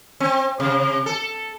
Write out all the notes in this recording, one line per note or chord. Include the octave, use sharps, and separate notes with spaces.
C4
C3
A4